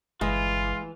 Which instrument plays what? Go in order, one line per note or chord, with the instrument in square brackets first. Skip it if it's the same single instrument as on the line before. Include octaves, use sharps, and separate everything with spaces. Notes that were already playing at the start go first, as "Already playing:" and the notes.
[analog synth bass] G1 [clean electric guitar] E3 [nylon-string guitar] G#3 [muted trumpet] F4